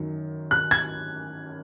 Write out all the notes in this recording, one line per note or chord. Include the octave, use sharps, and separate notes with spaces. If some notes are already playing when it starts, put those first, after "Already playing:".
Already playing: F#2 D#3 F#3
F#6
G#6